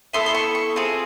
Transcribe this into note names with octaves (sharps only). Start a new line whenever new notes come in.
B3 E4 A4 C6
C6
C#6
C#6
C4 F4 G#4